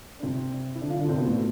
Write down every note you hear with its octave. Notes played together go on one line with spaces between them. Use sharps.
D4
C3 C4
E4
D3 D4
F3 F4
D3 D4
C3 C4
B2 B3
A2 A3